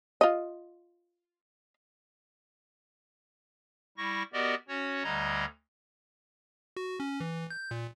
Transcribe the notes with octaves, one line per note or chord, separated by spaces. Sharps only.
F4 D#5
G3 E4 C#6 A#6
B3 F#4 G4 A#4 D5 D#5
C#4 F#4 C#5
D2 D3 G3 D#5 A#5 G#6
F#4
C#4
E3
G6
A#2